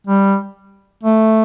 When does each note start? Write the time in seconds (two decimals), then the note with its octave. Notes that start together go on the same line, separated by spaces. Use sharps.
0.07 G3
1.03 A3